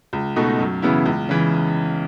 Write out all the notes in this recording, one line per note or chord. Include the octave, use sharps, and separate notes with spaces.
C#2
B2 A3 D#4 F#4
F#2
C#3 E3 B3 E4
C#2
C#3 E3